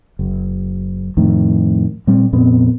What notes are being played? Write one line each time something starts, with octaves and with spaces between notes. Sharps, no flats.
F#1
F2 A2 D#3
A#2 G3 C4
F2 A#2 B3 C4